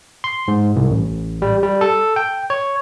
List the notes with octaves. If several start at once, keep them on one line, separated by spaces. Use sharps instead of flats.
C6
G#2
C2
A1
G3
G3
A4
G5
C#5